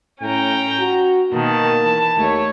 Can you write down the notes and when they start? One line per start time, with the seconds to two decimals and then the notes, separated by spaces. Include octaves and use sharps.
0.22 A2 C#4 G5 A#5
0.80 F#4
1.33 B2 D#3 A#3 A5
1.82 E3
2.17 D#2 A3 C#5